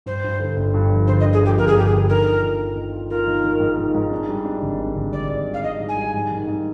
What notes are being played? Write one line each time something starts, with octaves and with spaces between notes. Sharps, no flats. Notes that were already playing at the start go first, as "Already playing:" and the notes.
G2 C5
G2
D3
G1
G2
F3
D3 C5
D#5
D3
G#4
F3 G4
G1 A#4
G#4
G1 G4
G#4
D3
D#3 A#4
F4
D#3
F4
D#3
F4
F4 A#4
D#3
D#3
G#2
D#3
G#2
D4
G3
D4
G#1
D4
G#1
G#1 D5
G#1
G3
F5
G3 D#5
G#2
G#5
G3
G#2
D#3
G#2